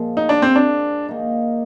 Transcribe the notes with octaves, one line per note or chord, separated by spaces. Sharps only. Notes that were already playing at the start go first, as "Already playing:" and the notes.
Already playing: A#2 F3 G#3
D#4
D4
C4
D4
D#3 A#3 D#4